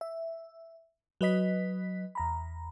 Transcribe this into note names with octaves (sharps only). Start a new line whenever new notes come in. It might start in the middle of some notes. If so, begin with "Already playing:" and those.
E5
F#3 B4 D#5 B6
E2 A#5 B5